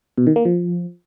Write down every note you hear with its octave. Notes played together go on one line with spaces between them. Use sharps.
B2
D#3
A#3
F3